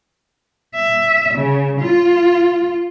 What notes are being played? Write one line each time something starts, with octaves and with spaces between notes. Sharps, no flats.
E5
C#3
F4